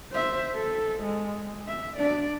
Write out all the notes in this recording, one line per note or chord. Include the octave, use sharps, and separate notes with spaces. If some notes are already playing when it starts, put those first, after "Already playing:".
C5 E5
A4
G#3
E5
D4 D5